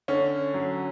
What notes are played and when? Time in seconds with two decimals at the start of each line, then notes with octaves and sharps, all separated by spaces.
0.08 D3 C#4
0.54 F#3